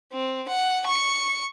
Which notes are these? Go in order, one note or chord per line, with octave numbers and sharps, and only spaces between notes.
C4
F#5
C#6 C#7